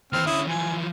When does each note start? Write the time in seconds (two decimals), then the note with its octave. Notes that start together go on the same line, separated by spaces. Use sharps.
0.13 D#2 E3 C4 F6
0.27 D3 C#4 E4 D#6
0.47 E3 F3 G#5